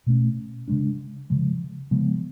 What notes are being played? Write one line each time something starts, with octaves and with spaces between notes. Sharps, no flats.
B2 A3 C#4
C#3 G#3 D4
C#3 F3 G#3
C#3 F3 G#3 B3